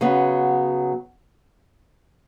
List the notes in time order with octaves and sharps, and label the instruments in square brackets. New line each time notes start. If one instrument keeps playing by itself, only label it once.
[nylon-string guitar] C#3 F#3 B3